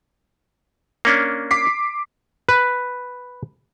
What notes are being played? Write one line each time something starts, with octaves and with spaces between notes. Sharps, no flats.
A#3 C#4 D4
D6 B6 C7
B4